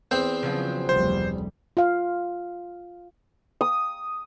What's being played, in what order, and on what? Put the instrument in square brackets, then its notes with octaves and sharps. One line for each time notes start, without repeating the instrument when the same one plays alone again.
[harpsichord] E2 C4 G5 [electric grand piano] C5
[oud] C#3 F3 F#3
[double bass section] F1 D2 G3 [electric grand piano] C5
[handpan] F4 F5
[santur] D#6